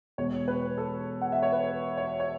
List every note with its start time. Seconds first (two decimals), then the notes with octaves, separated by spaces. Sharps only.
0.18 E1 E2 B2 C#5
0.48 B4
0.78 A4
1.21 F#5
1.32 E5
1.43 C#5
1.52 B4
1.97 C#5
2.20 C#5